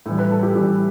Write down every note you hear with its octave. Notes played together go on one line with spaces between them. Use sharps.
A2 E3 G3
B4
A4
G4
A2 E3 G3 G4